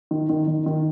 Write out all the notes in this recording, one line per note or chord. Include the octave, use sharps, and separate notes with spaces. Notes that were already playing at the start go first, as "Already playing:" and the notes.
D#3
D#3
D#3
D#3